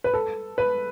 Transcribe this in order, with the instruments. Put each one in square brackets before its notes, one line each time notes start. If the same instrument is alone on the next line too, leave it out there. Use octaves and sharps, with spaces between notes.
[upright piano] B4
A4
B4